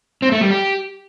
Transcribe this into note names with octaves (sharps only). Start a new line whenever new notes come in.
C4
A3
G3
G4